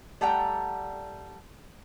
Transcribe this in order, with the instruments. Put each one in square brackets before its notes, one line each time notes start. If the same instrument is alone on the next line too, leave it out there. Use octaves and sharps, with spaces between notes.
[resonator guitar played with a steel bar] G3 A3 D5 F#5 G5 A#5